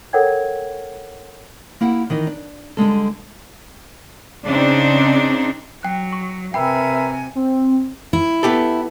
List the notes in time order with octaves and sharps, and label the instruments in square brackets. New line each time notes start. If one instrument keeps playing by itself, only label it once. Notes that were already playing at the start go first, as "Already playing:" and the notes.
[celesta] A4 A#4 C#5 F#5 G5 G#6
[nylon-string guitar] A#3 E4 G4 F#5
D#3 E3 D#5
D4
D3 G3 G#3 A4
[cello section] C#3 C4 D4 D#4
[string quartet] F#3 [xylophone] G5 F#6
[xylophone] C#6
[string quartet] C3 G#5 [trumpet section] A#4 B4 E5 [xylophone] G5 B5
[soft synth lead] C4
[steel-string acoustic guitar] E4
[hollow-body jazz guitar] B3 G4 A4